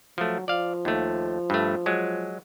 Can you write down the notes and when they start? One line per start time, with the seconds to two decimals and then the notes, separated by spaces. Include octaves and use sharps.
0.18 F3 F#3 A3
0.48 F3 D5 F5
0.85 D#2 A3
1.50 G2 A3
1.86 F#3 G#3